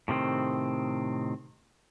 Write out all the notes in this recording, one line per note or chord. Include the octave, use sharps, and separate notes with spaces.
A2 C3 D#3 C4